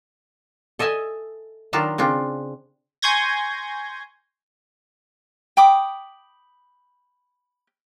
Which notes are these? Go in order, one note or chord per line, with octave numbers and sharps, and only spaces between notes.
A4 D#5 E5 G#5 A5
D#3 F#3 D4 F4 A5 A#5
C#3 C4 D4 F4
G#5 C6 C#6 G6 G#6 A#6
G5 B5 D6 D#6